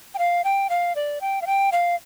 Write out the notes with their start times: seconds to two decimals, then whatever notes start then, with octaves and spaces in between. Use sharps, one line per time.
0.15 G5
0.19 F5
0.44 G5
0.70 F5
0.96 D5
1.21 G5
1.42 F5
1.47 G5
1.72 F5